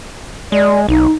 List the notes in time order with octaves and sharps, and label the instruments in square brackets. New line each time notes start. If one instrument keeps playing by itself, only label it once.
[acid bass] G#3 [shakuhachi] D5
[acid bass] B1 [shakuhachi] D#4